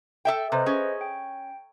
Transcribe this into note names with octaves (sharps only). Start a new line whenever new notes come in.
A4 E5 G5
C3 B4 C5 D#5
C#4 G#4
G5